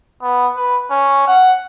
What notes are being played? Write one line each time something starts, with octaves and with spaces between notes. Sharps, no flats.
B3
B4
C#4
F#5